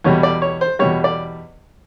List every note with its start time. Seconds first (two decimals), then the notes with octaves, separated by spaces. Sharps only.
0.04 E2 B2 G3 C#5
0.23 D5
0.42 C#5
0.61 C5
0.79 E2 B2 G3 C#5
1.04 D5